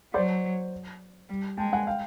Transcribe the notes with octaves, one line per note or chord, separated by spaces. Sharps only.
F#3 C5 D5
G3
G#3 G5 A5
F#5 G#5
F5 G5